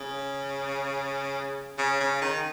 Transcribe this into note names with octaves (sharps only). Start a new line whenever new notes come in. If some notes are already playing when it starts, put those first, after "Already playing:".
Already playing: C#3
C#3
C#3
D#3